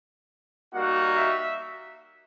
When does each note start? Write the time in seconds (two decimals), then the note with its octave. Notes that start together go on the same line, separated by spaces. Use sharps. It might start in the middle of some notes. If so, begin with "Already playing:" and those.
0.73 G3 A#3 D#4 F#4 F#5
1.16 E5